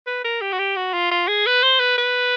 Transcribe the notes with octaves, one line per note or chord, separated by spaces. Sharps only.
B4
A#4
G4
F#4
G4
F#4
F4
F4
G#4
B4
C5
B4
B4